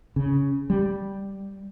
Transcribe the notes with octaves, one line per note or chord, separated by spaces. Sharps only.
C#3
G3